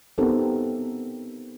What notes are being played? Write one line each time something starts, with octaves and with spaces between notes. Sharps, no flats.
B3 C4 D#4 G4 A4 A#4